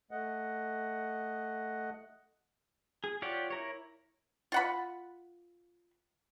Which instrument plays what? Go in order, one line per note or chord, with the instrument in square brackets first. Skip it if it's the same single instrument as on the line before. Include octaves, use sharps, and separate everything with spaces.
[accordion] A3 D#5 F#5
[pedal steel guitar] G#4
F4 G4 C#5 D5 F#5
E4 A#4 C#5
[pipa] F4 F#5 B5